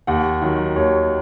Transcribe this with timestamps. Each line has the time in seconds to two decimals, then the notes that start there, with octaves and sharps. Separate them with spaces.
0.07 D#2 F#5
0.42 D#3 F#3
0.76 D#2 C#5